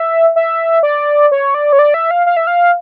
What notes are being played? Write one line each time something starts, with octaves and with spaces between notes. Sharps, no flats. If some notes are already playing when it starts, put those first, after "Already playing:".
Already playing: E5
E5
D5
C#5
D5
C#5
D5
E5
F5
F5
E5
F5